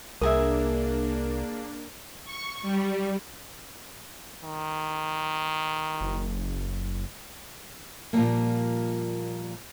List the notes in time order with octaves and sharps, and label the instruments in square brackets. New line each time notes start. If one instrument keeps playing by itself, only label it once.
[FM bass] C2 [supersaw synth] A#3 D4 [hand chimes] G#4 A#4 [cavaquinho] E5 G#5 D#6
[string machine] C#6
G3
[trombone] D#3
[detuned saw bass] F#1
[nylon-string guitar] A#2 F3 G3 G#3 A#3